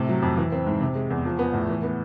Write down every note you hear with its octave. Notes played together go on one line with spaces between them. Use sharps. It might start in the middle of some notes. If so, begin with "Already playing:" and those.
Already playing: A2 C3
F#3
F2
E3
C4
G#2
C3
G#3
E2
F3
B3
A2
E3
B3